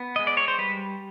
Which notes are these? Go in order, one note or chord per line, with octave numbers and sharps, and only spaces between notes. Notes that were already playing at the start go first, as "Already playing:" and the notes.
Already playing: B3
G#3 D#5
D5
C#5
C5
G3 B4